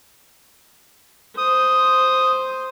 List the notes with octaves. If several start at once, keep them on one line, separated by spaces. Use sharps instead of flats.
C5 D#6